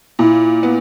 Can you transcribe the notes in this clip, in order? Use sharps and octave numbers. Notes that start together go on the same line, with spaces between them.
A#2 E4
B3